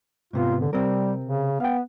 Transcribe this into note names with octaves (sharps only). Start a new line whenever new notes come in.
G#2 C3 B3 F4
D3
C3 G3 C4 A#4
C#3
B3 F5 G5